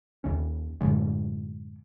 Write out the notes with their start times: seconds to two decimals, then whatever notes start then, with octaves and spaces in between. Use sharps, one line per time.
0.24 D#2 D#3 C#4
0.81 F#2 A2 D3 G#3